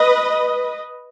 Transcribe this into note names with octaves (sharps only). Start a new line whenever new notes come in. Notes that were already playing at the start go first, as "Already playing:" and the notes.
Already playing: B4 D#5